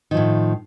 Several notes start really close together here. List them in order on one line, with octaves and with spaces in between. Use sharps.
D#3 F3 A2